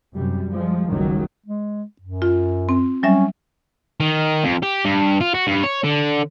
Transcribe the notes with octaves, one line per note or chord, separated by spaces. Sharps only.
F#2 C3 G3
F3 G3 G#3
F#1 C#2 D#3 F#3 G3
G#3
F#2
F4
C4
F#3 G3 C#4 E5
D#3
F2
G4
G2
F4
F#4
G2
C#5
D3